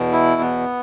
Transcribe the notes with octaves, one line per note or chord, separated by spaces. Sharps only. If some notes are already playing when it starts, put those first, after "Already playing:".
Already playing: E2 B2
E4
B3